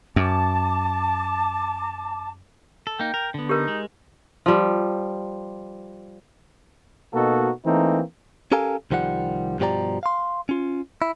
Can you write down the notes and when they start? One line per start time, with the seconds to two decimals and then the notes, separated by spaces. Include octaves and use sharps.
0.16 F#2 A5 D6
2.87 A4
3.00 A#3 D#4 G5
3.14 A#4
3.34 D3 B3
3.49 D#4 G4 A#4
3.68 G#3
4.46 F3 G3
7.14 B2 A#3 D#4 F#4 A4
7.66 E3 A3 A#3 C4 D#4
8.52 C#4 G4 A4 A#4 F5 G#5
8.91 C2 D#3 F3 G3 F#5
9.59 G2 B2 F3 G4 D5 A#5
10.03 F5 C6
10.49 C#4 F4
11.02 E4